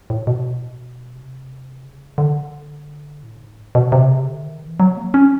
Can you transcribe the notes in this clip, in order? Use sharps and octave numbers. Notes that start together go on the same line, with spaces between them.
A2
B2
C3
C#3
D3
A2
G#2
B2
C3
C#3
D3
D#3
E3
F#3
A#3
C#4